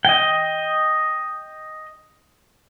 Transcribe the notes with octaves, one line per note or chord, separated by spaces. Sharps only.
D#5 G5